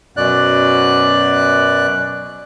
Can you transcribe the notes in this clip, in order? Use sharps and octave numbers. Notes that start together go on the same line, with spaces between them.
F#2 B2 D5 F#6